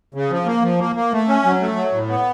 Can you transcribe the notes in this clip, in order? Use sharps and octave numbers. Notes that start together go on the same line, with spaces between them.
C#3
F3
A#3
F3
A#3
A#3
A3
C#4
F#3
A3
F#3
A2
B3